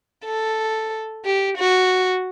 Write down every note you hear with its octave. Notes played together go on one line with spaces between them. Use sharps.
A4
G4
F#4